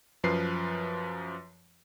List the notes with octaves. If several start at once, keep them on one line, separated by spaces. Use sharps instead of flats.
F#2 F3 B4 C7